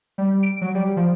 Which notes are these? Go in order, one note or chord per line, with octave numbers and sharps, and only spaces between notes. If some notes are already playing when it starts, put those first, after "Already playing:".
G3
D7
F#3
G3
F3